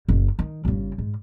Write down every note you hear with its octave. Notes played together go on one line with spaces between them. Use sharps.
F#1 C#3
D#3
G1 C#3
G#2